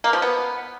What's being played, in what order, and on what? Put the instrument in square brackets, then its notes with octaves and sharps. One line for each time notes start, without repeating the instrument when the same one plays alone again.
[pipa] A#3
F3
B3